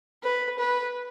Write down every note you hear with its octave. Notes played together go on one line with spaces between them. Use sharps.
B4
B4